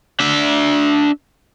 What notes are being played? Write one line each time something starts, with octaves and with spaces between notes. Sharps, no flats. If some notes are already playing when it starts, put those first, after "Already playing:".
D4 E5